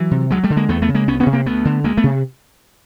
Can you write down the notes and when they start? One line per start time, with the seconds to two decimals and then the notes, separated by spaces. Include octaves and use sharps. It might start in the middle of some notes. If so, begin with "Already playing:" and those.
Already playing: E3 F#3
0.11 C3
0.30 D2 F#3 G#3
0.43 G3 A3
0.50 D3
0.57 G#3 A#3
0.69 E2 A3 B3
0.82 A3 B3
0.88 C#3
0.95 G#3 A#3
1.08 C2 B3 C#4
1.20 B3 C#4
1.26 C3
1.33 A#3 C4
1.46 D2 A3 B3
1.65 D3
1.84 D2 G#3 A#3
1.97 A3 B3
2.04 C3